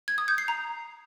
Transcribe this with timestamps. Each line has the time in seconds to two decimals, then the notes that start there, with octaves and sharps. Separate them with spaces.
0.08 G#6
0.18 D#6
0.28 G6
0.38 C7
0.48 A#5